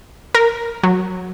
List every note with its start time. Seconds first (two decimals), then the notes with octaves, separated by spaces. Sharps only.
0.35 A#4
0.83 F#3